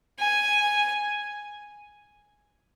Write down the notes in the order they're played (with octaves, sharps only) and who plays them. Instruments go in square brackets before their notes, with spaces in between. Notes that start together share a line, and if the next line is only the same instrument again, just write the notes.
[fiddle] G#5